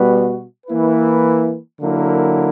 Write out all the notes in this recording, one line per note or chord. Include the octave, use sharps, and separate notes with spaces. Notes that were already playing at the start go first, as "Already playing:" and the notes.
Already playing: B2 G3 B3 F#4 B4
E3 A#3 E4 B4
D3 F#3 A#3 E4 A#4